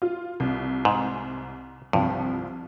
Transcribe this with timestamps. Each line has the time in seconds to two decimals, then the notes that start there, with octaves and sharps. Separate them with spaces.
0.02 F4
0.40 C2
0.85 G#2
1.93 C2 G2 F3